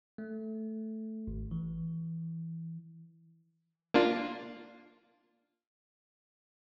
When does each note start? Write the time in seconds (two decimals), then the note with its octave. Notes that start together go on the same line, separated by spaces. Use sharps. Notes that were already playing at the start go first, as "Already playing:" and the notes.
0.18 A3
1.27 G#1
1.51 E3
3.94 A#3 D4 F4